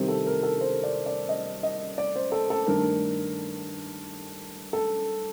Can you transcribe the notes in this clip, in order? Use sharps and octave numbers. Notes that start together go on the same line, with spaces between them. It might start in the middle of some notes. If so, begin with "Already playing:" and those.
Already playing: C2 C3 D#3 G3 C4
A4
A#4
A4
C5
D5
D5
D#5
D#5
D5
C5
A4
A4
G2 D#3 A3 D4 A#4
A4